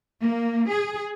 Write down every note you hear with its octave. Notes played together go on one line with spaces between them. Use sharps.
A#3
G#4